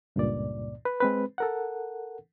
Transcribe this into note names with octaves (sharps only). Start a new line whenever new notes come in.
C#2 G2 A#2 D5
B4
G#3 C4 B4
A4 A#4 F#5